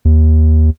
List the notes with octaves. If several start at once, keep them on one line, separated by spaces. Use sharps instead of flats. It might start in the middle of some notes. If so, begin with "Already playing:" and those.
D#2